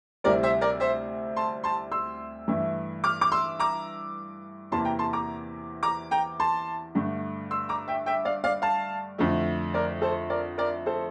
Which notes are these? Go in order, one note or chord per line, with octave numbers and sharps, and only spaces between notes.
D2 C3 G3 C4 E4 A#4 D5
C5 E5
A#4 D5
C5 E5
A5 C6
A5 C6
C6 E6
G2 E3 A3 E4
D6 F6
D6
C6 E6
A#5 D6
E2 C3 E3 A#3 A5 C6
G5 A#5
A5 C6
A#5 D6
A#5 D6
G5 A#5
A5 C6
G2 D3 A3
C6 E6
A#5 D6
E5 G5
E5 G5
D5 F5
D5 F5
F5 A5
F2 D3 A3 E4
A#4 D5
A4 C5
A#4 D5
A#4 D5
A4 C5